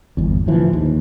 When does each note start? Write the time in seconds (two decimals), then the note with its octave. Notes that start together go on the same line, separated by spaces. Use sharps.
0.17 G1 E2
0.47 D1 D2 E3 F3
0.73 D#2